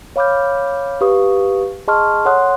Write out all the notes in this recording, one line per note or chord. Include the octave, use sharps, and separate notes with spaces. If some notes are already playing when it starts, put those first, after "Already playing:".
C#5 F5 B5 D6 F6 G6
G4 B4 F5 C#6 D#6
G#4 D#5 A5 C6 C#6 F6
A4 C#5 F#5 C6 D#6 F#6